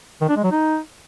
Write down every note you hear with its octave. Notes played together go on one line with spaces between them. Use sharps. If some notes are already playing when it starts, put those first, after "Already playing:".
D#3
D4
G#3
F#3
D#4